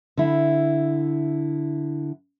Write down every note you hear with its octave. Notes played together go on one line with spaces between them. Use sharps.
D3 E4